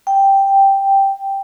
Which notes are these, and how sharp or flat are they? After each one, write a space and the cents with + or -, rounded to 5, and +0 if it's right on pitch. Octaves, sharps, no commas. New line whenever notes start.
G5 +0